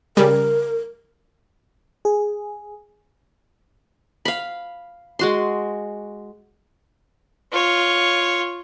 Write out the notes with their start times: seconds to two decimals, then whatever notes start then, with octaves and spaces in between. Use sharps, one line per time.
0.17 C#3 G3 A#4
2.05 G#4
4.25 F5 B5
5.19 G#3 F#4 C6
7.52 F4 C#5